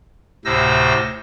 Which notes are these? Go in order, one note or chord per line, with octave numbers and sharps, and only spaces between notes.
D2 A2 C3 C5 E6 A#6